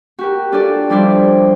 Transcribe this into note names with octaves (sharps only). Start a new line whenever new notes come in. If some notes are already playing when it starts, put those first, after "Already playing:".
F#4 G4 A#4
D4 F4 G4 A4 D5 A5
F3 G3 D4 E4 C5 D5